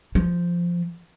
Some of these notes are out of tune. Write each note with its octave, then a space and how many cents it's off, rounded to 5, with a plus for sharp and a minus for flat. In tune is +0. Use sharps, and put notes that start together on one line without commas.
F3 -5